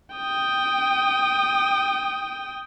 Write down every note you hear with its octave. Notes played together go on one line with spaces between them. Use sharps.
G5 D#6